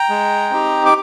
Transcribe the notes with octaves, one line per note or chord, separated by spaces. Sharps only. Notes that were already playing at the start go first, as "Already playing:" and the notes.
Already playing: G5 A#5
G#3
C4 D#4 G4
D6